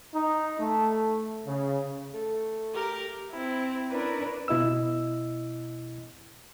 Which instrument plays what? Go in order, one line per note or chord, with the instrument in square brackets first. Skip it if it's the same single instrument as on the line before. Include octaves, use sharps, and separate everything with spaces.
[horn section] D#4
A3
C#3
[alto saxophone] A3
[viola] G4 A#4
[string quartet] C4 E4
C#4 D4 E4 A#4 B4
[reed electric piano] B2 E4 D#5 E6